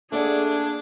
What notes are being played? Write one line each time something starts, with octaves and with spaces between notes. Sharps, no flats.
A3 A#3 D4 G#4 D5 F#5